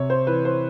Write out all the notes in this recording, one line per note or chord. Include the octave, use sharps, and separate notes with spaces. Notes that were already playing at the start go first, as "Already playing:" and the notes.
Already playing: C3 C#5
C5
E3 B4
C5